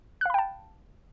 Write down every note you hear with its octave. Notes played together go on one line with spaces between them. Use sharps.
F5 G5 A5 B5 F#6